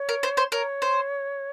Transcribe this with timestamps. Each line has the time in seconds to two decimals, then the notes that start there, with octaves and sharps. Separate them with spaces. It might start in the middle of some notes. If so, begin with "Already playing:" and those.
Already playing: C#5
0.09 A#4
0.23 C5
0.37 C5
0.52 A#4 C#5
0.82 C5